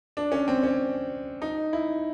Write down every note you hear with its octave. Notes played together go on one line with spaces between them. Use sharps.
D4
C#4
C4
C#4
D#4
E4